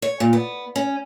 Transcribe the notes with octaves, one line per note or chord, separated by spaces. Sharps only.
C#5
A#2
B3
C#4